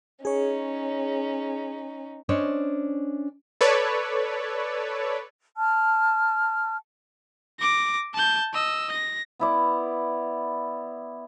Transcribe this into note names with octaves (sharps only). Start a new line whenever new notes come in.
C#4 D#4 G#4 C#5
C#4 D4 C5 C#5 D#5
A4 B4 C#5 D5
A5 F6
D6 A#6
A5 G6
D#5 E6
A#6
B3 E4 D5